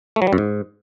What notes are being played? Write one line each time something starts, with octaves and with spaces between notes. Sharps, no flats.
A3
F#3
G3
F#2
G#2